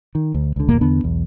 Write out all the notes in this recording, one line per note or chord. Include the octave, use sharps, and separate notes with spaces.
D#3
D2
C#2 D3
F#1 D#2 A#2 A#3
E2 D3 B3 D4
B1 E2